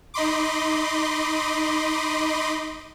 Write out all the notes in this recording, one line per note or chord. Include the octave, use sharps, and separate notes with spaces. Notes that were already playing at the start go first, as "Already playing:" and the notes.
D#4 D#5 B5 C6 D6